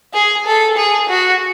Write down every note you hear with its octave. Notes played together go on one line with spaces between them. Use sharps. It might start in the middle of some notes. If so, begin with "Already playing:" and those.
G#4
A4
G#4
F#4